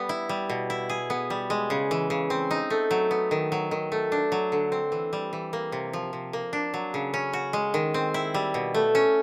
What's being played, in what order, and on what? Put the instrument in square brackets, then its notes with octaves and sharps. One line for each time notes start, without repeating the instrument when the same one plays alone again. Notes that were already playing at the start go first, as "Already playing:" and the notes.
Already playing: [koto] G3 B3
E4
G3
B2
E4
G#4
B3
G3
G#3
C#3
E3
C#3
C4
D#4
A3
F#3
B3
D#3
F#3
D#3
A3
D4
F#3
D3
C4
E3
G3
E3
A#3
C3
F3
C3
A#3
D4
F#3
C#3
C#4
F#4
G#3
D#3
C4
E4
G3
B2
A3
C#4